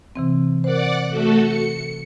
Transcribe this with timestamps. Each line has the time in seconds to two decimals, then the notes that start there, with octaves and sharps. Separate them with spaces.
0.16 C3 E3 C4
0.64 A#4 C5 D5 F#5 D6
1.09 A3 F#4 A4
1.40 A4 C#7